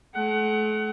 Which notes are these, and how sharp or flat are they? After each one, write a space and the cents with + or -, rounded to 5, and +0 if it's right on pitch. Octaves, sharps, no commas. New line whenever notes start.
A3 -40 F#5 +25